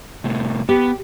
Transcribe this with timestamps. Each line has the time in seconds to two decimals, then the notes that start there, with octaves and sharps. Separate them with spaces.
0.24 A2 C3
0.69 B3 G4